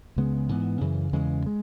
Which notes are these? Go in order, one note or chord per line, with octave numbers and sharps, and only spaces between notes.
C#2 C#3 G#3 B3
G#2 E3 B3
F#2 C#3 E3
E2 C#3 E3 G#3
G#3